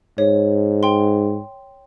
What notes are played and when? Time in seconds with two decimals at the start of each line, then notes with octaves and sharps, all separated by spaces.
0.18 G#2 C#5
0.83 G5 C6